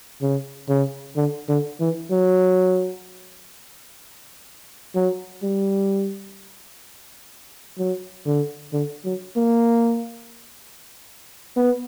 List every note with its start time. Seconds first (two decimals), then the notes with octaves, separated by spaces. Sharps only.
0.22 C#3
0.69 C#3
1.16 D3
1.49 D3
1.80 E3
2.11 F#3
4.95 F#3
5.43 G3
7.78 F#3
8.26 D3
8.73 D3
9.05 F#3
9.37 A#3
11.57 B3